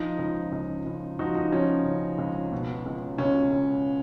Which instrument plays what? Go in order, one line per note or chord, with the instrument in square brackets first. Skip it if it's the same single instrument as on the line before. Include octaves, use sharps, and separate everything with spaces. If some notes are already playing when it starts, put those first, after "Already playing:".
Already playing: [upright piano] F3 D#4
C#2
C#2
C#2
F3 D#4 F#4
D#4
F3 C#4
C#3
C#2
B2
C#2
C#2 C#4
C#2